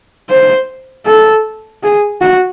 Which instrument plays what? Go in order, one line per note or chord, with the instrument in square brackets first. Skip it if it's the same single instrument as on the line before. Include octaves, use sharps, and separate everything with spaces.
[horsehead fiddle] C5
A4
G#4
F#4